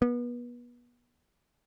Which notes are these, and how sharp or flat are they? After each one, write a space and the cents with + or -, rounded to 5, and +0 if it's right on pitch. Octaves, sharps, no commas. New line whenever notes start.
B3 -30